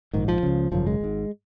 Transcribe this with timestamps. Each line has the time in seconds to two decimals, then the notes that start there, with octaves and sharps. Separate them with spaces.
0.13 A#1 G#2 D#3
0.28 F3
0.43 C#2 C#3
0.71 G#1 F#2 C#3 F3
0.87 G#3
1.00 G#1 G#2